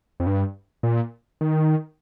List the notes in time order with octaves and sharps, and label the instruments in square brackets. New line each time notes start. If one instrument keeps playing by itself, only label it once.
[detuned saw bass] F2
G2
A#2
D#3